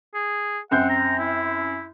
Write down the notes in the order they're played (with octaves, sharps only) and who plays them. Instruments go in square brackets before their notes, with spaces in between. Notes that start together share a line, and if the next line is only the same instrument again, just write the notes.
[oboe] G#4
[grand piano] F#2 C4 G6 [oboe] F#5
[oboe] A#5
E4